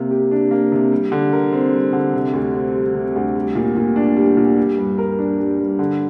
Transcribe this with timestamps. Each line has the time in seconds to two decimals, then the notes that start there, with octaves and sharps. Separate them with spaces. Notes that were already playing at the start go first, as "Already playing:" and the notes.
Already playing: C3 A#3
0.10 G4
0.31 D4
0.51 A#3
0.72 C3
0.92 G3
1.12 D3
1.33 A#4
1.53 C4
1.73 G3
1.93 D3
2.14 C3
2.33 D2
2.54 C4
2.75 G3
2.94 C3
3.16 D2
3.35 G3
3.55 A#2
3.76 A#2
3.96 D4
4.16 G3
4.37 A#2
4.58 G3
4.78 G2
4.98 A#4
5.19 D4
5.38 G3
5.59 G2
5.79 D3